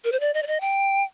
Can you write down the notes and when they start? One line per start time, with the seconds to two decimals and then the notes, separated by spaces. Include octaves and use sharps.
0.04 A#4
0.12 C5
0.20 D5
0.34 D#5
0.43 D5
0.47 D#5
0.61 G5